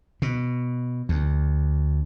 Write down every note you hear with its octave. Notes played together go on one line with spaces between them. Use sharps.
B2
D2